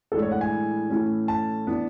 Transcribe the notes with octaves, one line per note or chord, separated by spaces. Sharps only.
A2 E3 G#3 D4 A4
C#5
F#5
G#5
A2 E3 A3 C#4
A5
E3 B3 D4